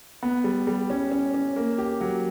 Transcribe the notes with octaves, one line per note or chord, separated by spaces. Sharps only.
B3
G3
G3
C#4
C#4
C#4
A#3
G4
F#3